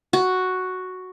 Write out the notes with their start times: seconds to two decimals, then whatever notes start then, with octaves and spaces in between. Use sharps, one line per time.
0.13 F#4